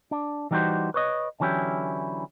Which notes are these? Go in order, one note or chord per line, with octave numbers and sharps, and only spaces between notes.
D4
E3 G3 D#4 F#4 G4 C5
B4 C#5 D#5
D3 E3 F#3 C#4 E4 G4